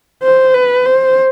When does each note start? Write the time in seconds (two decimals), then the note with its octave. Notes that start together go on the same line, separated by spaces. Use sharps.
0.23 C5
0.54 B4
0.86 C5